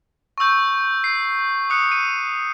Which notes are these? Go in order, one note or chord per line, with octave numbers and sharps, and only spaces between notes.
C#6 E6 G6
C7
D#6 F#6 C#7
D#7